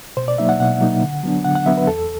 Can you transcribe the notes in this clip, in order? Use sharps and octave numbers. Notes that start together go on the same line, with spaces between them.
B2 C5
D5
F#3 A#3 D#4 E5
F#5
B2 F#5
F#3 A#3 D#4
D3
F#3 B3 D4
D3 F#5
F#5
F#3 B3 D4 E5
B4
E2 A4